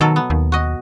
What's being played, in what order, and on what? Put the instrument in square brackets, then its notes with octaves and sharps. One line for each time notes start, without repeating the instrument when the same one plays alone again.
[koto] B2 F#3 A4 [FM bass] D#3
[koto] B3
[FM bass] D#2
[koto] F#4 D#5